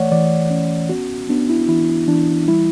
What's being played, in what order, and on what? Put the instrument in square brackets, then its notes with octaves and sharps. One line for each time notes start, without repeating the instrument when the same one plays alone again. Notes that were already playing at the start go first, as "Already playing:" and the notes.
Already playing: [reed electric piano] E3 A3 C#5 D5 F#5
E3 D5
C#4
B3 F#4
B3 D4
E4
E3 E4
E3 D4
G3 E4